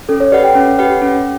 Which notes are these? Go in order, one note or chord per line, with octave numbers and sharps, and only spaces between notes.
C#4 A4
C#5
G4 B4 D5 F#5
G5
C#4
G4 B4 F#5
C#4